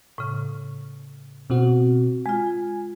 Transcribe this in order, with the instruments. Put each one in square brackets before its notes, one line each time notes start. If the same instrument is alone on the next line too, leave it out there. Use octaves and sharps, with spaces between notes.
[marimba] A2 C#3
[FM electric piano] B2 C4 F#4
[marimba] G#3 F4 [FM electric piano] G#5